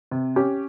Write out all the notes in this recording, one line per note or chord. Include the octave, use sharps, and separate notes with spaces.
C3
C#4 G4